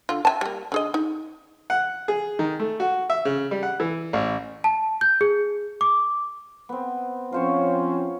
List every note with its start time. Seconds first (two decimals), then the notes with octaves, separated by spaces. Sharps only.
0.09 D3 F4
0.25 E5 G#5 A5
0.41 G3 A#3
0.72 D3 G#4 D#5
0.94 D#4
1.70 F#5
2.08 G#4
2.39 D#3
2.60 A3
2.80 F#4
3.10 E5
3.25 C#3
3.51 G3
3.63 F#5
3.80 E3
4.13 A1
4.64 A5
5.01 G6
5.21 G#4
5.81 D6
6.69 B3 C4
7.32 F3 C4 C#4 F4 C5 C#5